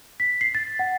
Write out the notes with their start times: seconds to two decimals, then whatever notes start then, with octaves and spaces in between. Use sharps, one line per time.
0.20 B6
0.41 C7
0.55 A6
0.79 F#5